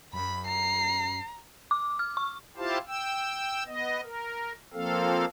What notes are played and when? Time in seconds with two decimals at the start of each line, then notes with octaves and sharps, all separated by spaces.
0.13 F#2 B5
0.47 A#5 C7
1.71 D6
1.99 F6
2.17 C#6
2.57 E4 F4 G4 C5 F5 A5
2.87 G5 E6
3.66 B3 D#5
4.03 A#4
4.73 F3 A#3 C4 A4 F5